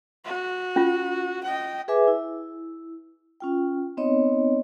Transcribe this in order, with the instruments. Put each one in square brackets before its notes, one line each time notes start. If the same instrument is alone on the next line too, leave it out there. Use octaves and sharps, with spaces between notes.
[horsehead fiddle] F#4
[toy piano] C#4 F4
[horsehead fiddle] D#5 G5
[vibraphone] G#4 B4 E5 G#5 D6
E4
C#4 F4 G5
B3 C4 D#4 C#5 D#5